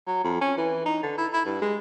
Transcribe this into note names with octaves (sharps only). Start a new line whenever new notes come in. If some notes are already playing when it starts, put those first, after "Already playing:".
F#3
F2
C#4
E3
D#4
D3
E4
E4
G2
G#3